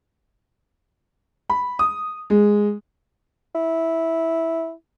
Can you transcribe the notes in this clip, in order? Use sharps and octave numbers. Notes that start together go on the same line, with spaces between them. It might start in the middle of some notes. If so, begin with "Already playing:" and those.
B5
D#6
G#3
E4